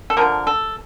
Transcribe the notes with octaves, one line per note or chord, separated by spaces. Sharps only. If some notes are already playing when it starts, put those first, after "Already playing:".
A4
D3 F3 A#3 A#4
A4